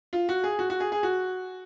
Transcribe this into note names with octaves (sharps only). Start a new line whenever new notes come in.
F4
F#4
G#4
F#4
F#4
G#4
G#4
F#4